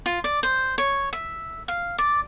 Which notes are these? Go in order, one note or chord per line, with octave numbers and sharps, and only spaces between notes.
F4
D5
C5
C#5
E5
F5
D5